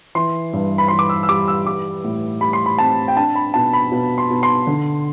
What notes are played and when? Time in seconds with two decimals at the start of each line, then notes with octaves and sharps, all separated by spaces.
0.15 E3 C6
0.53 G2
0.78 B5
0.88 E3 C6
0.99 D6
1.09 E6
1.23 E6
1.29 G3 D6
1.48 E6
1.66 G3 D6
2.04 A2
2.41 G3 B5
2.53 C6
2.66 B5
2.78 C4 A5
3.08 G5
3.16 D4 A5
3.35 B5
3.54 B2 A5
3.73 B5
3.91 B2
4.18 C6
4.30 B2
4.43 C6
4.67 D3